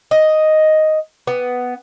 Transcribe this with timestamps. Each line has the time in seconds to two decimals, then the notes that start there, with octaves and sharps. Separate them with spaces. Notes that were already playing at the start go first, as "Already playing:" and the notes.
0.11 D#5
1.27 B3